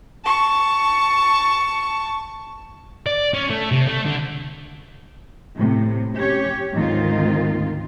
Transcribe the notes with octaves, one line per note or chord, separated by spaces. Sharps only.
A5 C#6
D5
C#4
A3
C3
A3
D3
A2 C3
C#4 G4 C#5
D2 G#2 D#3 C4 F4